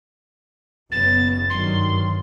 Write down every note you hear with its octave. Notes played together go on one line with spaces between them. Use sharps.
F#1 C#3 B3 A6
G2 D#3 F#3 C6